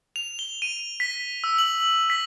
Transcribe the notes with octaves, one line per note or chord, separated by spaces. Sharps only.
F7
G7
D#7
B6
E6
F#7
B6